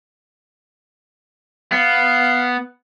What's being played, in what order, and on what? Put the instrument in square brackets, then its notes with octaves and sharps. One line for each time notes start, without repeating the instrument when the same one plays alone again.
[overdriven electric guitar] B3 [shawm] F5